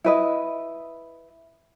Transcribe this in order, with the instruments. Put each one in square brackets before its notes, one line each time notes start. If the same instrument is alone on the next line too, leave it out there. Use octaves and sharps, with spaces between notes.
[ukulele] E4 B4 D#5